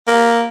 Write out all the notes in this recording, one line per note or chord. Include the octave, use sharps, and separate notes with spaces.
A#3